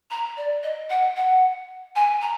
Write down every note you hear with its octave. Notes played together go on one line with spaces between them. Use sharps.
A#5
D5
D#5
F#5
F#5
G#5
A#5